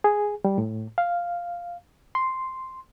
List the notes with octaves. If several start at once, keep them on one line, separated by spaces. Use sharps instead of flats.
G#4
G3
A2
F5
C6